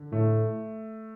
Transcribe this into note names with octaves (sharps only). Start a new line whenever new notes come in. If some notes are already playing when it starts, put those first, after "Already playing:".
Already playing: D3
A2 A3